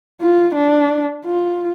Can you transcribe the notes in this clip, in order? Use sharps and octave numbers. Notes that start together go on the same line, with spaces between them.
F4
D4
F4